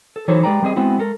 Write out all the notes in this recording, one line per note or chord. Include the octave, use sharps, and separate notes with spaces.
A4
E3 F#3 D#4 A4 C5 C#5
G#3 G4 B4 D5 G5 A#5
G3 C4 G#4 D#5
G#3 B3 C4 E4 F#4
G#3 A4 A#4